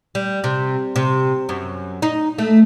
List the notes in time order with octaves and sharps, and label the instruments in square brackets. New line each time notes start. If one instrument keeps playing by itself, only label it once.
[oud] G3
C3
C3
F#2
D#4
A3